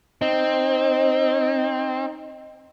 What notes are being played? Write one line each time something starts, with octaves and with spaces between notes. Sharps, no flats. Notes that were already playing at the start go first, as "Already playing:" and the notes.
C4 D#4